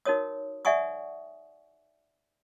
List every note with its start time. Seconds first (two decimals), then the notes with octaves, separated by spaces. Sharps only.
0.05 D#4 F#4 A#4 C#5 D#6
0.65 D5 E5 F#5 G#5 C#6 D#6